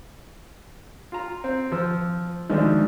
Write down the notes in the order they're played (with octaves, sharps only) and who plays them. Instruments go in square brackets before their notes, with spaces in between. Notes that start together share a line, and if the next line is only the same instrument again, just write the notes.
[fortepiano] F4 A#5
C4
F3 E6
[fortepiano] D2 F3 D4 [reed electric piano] D#3 G#3 D#4